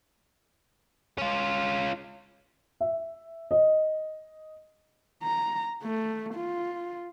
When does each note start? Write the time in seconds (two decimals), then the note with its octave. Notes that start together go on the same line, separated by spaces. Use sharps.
1.18 C#4 F4
2.81 E5
3.51 D#5
5.23 A#5
5.82 A3
6.34 F4